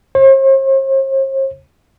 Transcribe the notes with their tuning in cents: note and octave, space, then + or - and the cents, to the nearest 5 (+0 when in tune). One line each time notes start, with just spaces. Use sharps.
C5 +45